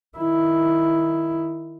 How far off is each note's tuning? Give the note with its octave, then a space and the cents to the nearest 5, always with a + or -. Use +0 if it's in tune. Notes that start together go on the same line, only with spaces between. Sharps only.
D#3 +0 E4 +0